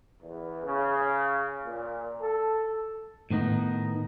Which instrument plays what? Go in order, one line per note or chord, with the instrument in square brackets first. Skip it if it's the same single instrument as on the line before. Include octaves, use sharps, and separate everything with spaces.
[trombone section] E2
C#3
A#2
A4
[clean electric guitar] A2 D#3 B3 D#4